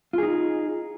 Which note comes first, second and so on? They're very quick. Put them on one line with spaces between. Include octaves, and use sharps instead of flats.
F4 G#4 D#4